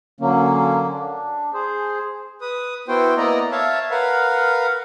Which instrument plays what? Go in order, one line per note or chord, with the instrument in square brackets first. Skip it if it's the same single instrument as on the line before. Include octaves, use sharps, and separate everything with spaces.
[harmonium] D3 F#3 A#3 C#4
D4
G#4 C5
[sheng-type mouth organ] B4 D#6
B3 E4 F#4 C5 G5
A#3 B3 E4 D5 D#5 A#5
C#5 E5 F5 A5
A#4 B4 F5 F#5